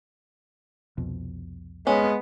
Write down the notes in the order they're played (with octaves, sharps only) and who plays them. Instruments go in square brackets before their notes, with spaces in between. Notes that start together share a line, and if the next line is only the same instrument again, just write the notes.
[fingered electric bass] C2 F2 B2
[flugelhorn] G#3 [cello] B3 [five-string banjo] C#4